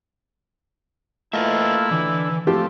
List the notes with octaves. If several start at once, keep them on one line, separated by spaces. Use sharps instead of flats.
A3 A#3 E4 F4 B4 D#5 E5
D3 E3
F3 A3 C4 G4